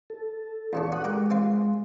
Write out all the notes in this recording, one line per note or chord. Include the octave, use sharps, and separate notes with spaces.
A4
E2 C#3 D4 C#6
F#4 D#6 F#6
G#3 G4 A#4 G5
C4 F4 F5